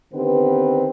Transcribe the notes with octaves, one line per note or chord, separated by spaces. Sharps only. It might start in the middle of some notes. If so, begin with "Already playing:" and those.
D3 D#3 B3 C4 G4 B4